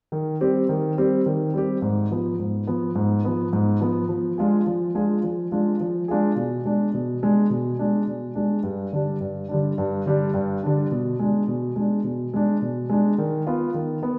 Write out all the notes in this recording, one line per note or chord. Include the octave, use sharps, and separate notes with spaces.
D#3
G3 C4 G4
D#3
G3 C4 G4
D#3
G3 C4 G4
G#2
F3 B3
G#2
F3 B3
G#2
F3 B3
G#2
F3 B3
F3
G#3 D4 F4 G#4
F3
G#3 D4 F4 G#4
F3
G#3 D4 F4 G#4
F3
G#3 D4 F4 G#4
B2
G#3 D4
B2
G#3 D4
B2
G#3 D4
B2
G#3 D4
G2
D3 G3 D4
G2
D3 G3 D4
G2
D3 G3 D4
G2
D3 G3 D4
B2
G#3 D4
B2
G#3 D4
B2
G#3 D4
B2
G#3 D4
D#3
B3 F4
D#3
B3